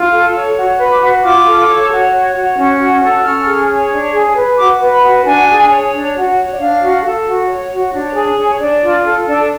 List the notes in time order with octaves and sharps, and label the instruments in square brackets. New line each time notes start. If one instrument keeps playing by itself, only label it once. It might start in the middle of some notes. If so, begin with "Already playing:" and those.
Already playing: [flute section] F4
A4
C#5
F#4
B4
D6
F#4
F4 D6
A4
C#5
F#4
C#5
F#4
C#4
F#4
A4
C#4 F6
G#4
C#5
D4
G#4
B4
F#4 D6
B4
B5
F#4
D4 G#5
G#4
C#5
D4
F#4
C#5
D5
D4 F5
F#4
A4
F#4
C#5
F#4
D4 C#5
G#4
C#5
C#5
D4 D5
F4
A4
D4